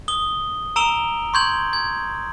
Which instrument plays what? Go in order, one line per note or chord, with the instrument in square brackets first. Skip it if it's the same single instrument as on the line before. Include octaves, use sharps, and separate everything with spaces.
[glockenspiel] D#6 G7
A#5 E6 D7 F7 G7
C6 C#6 G6 G#6 F#7
G#6